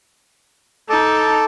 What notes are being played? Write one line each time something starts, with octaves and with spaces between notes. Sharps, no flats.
D#4 A4 A5 D6